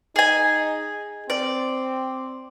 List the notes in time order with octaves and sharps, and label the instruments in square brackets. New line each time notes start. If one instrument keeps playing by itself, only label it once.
[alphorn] D#4 [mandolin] G#4 G#5
[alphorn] C4 [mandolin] D5